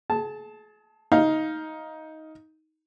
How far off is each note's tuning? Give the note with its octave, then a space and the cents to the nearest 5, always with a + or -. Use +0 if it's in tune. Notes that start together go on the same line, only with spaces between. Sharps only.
G#4 +35 A5 +0
D#4 +15 F5 +0